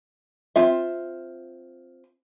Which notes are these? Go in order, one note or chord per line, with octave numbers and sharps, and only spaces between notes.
C4 F4 E5